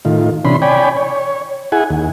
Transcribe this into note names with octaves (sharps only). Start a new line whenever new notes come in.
A2 D#3 F4
C3 E3 C#4 D4 B5 C6
C#5 D5 G5 G#5 B5
C#5
E4 G#4 F#5 G#5
D#2